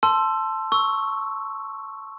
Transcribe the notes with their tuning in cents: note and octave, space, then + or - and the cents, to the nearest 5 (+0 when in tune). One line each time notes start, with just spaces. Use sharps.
A5 +0 C6 +5 E6 +20
C#6 +0 E6 -10